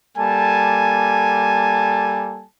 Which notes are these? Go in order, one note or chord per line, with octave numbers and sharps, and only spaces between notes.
G3 A#3 A4 G#5 A5